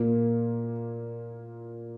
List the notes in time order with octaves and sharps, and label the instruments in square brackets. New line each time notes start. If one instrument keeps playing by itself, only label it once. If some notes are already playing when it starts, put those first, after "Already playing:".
Already playing: [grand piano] A#2 A#3